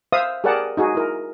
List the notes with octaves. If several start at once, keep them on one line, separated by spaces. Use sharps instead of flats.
C5 E5 F5 D#6
G4 G#4 A#4 D5 F#5 A5
D#4 F#4 G#4
E4 A#4